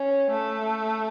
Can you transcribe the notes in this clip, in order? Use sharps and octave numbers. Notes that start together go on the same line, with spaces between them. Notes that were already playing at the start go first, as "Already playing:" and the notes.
Already playing: C#4
A3